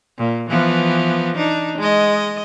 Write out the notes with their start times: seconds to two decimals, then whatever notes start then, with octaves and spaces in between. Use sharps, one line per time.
0.18 A#2
0.50 E3 F3 B3
1.37 D4 D#4
1.78 G#3 D#5